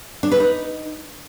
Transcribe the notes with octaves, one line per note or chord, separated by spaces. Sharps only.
D4
B4
D#4